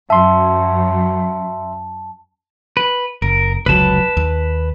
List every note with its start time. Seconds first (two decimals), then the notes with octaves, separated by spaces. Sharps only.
0.10 F#2 E5 A5 C6
2.77 B4
3.22 F#1 A#4
3.66 F1 C#2 F#3 B4 A5
4.17 D#2